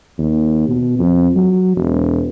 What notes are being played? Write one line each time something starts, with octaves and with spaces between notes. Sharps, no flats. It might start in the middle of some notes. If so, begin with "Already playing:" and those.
D#2
B2
F2
F#3
E1